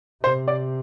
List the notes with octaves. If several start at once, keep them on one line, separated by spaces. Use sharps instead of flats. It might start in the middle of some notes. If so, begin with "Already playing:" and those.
C3 C5
D5